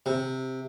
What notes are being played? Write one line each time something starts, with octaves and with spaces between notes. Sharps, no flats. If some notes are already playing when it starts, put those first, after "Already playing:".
C3